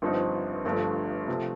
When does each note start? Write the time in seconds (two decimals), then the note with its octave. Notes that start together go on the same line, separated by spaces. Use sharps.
0.02 G1 G2 F3 C4 D#4
0.65 G1 G2 F3 A3
1.28 C3 F3 A3